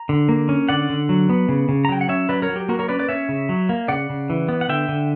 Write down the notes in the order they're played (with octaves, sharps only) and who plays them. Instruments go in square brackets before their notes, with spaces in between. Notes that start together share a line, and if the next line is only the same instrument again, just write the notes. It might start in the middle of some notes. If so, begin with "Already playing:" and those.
Already playing: [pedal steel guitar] A#5
D3
A#3
C#4
D3 D5 F#5
D3
F#3
B3
C#3
C#3
A#5
F#3 G5
F#5
C#4 C#5 E5
F#3 B4 D5
A#4 C#5
F#3
G4
A#3 F#4 A#4
A#4 C#5
C#4 B4 D5
B4 D5
C#4 C#5 E5
C#3
F#3
A#3
C#3 D5 F#5
C#3
E3
B3
F#5
D3 E5 G5
D3